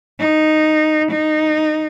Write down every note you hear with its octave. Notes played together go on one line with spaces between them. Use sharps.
D#4
D#4